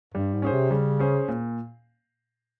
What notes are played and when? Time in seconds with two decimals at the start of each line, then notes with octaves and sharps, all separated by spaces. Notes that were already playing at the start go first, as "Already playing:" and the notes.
0.14 G2 G3
0.34 G#2
0.42 C#4 G#4 C5
0.52 C3
0.71 C#3 G3
0.99 C#4 G#4 C5
1.28 A#2